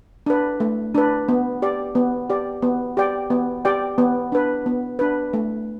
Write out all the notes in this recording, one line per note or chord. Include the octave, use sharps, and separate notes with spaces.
D4 B4
A3
D4 B4
B3
G4 D5
B3
G4 D5
B3
G4 D5 G5
B3
G4 D5 G5
B3
D4 B4
B3
D4 B4
A3